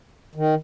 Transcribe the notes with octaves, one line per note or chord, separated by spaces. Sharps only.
D#3